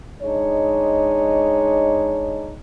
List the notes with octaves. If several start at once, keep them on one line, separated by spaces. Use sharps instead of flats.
G#3 D4 D#4 C#5